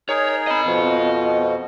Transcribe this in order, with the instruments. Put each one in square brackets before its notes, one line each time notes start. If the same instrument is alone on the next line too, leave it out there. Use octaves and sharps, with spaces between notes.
[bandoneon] D#4 G#4 A#4 [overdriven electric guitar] C#5
[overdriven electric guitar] D#5 B5
[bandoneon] F2 B2 F3